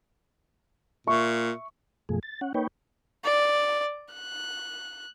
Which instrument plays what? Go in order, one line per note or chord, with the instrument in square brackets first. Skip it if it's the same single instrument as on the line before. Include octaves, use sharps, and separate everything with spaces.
[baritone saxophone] A#2 [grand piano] E5 C#6
[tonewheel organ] F#2 B2 F3 A3 G#4
A6
C#4 F#5
A#3 D#4 B4 C#5 G5
[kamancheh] D5
F#6